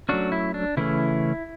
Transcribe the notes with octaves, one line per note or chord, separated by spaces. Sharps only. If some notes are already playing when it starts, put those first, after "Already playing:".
F#3 A3 C#4 D4 F#4
E4
D4
C#3 E3 A3 C#4 E4